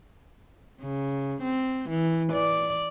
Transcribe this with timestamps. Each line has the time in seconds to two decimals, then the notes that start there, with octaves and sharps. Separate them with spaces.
0.81 C#3
1.43 C4
1.90 E3
2.33 D5